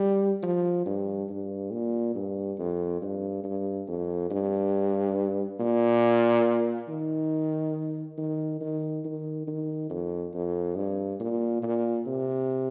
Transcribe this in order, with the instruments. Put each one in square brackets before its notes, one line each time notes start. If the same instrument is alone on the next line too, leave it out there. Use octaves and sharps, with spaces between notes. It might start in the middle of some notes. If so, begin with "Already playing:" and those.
Already playing: [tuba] G3
F3
G2
G2
A#2
G2
F2
G2
G2
F2
G2
A#2
D#3
D#3
D#3
D#3
D#3
F2
F2
G2
A#2
A#2
C3